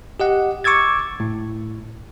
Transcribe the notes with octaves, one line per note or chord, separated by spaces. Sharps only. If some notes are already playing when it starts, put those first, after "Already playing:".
G4 D#5 F#5
C#6 D6 E6 G#6 A6
A2